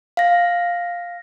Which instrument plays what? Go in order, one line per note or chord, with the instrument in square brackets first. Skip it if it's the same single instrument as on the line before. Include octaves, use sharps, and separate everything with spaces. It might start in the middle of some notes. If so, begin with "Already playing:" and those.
[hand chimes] F5 A#6